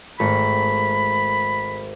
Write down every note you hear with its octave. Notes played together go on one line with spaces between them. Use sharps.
G#1 A3 A#5 B5